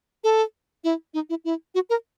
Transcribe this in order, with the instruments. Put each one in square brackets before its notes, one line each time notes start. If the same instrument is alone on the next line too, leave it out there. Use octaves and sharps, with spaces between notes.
[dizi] A4
E4
D#4
E4
E4
F#4
A#4